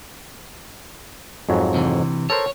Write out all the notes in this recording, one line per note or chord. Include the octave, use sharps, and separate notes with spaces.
F2 G#2 F#3
C3 E3
A4 A#4 C5 C#5